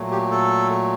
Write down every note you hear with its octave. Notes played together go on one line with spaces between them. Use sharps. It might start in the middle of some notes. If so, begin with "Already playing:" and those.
Already playing: A#2 F#3 A3
G4
A4